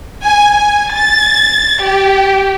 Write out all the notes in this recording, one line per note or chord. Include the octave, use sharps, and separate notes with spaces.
G#5
G#5
A6
G4